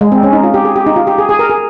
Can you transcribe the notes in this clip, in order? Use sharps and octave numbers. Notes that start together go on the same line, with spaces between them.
G#3
C4
C#4
D#4
F4
G4
G#4
G4
D#4
F4
G4
G#4
G#4
A#4
G#4